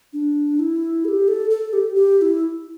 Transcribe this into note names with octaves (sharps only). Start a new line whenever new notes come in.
D4
E4
A4
G4
A4
A4
G4
G4
G4
E4